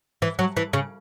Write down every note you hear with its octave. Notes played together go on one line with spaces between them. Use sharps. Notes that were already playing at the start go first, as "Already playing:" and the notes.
E3
F#3
E3
C#3